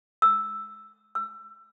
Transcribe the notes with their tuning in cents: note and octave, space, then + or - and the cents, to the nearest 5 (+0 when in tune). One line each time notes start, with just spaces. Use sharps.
E6 +0
E6 +30